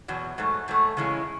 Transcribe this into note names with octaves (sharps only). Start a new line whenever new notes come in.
E2 B2 F#3
G#2 F#3 A3
G#2 F#3 A3
C#3 E3 G#3 C#4 E4